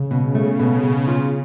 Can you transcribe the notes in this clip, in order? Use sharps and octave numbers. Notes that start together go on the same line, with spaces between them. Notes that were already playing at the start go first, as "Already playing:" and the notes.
Already playing: C#3
B2
A3
B2
B2
F4